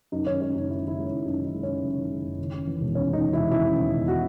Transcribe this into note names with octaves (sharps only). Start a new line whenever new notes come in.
F#2 D#4
D#3 C#4
G#3 C#4
F#1 D#4
F#2 E4
D#3 E4
G#3
F#1 C#4
F#2 D#4
D#3
D#4
G#3
F#1 C#4
F#2
D#3
G#3
F#1
D#2
C#3
E3
E1
D#2 C#4
C#3 D#4
E3
E1 E4
D#2 E4
C#3
E3
E1
F#4